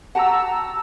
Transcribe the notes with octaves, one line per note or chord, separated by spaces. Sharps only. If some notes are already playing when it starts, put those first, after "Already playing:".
F#4 G4 F#5 A5 A#5 E6